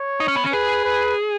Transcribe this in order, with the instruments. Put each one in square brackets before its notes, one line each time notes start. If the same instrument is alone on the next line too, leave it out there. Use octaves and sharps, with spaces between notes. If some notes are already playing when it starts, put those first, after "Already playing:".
Already playing: [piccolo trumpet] C#5
[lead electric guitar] D#4
C#4
B3
C#4
[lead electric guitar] G#4 [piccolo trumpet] B4
[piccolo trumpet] B4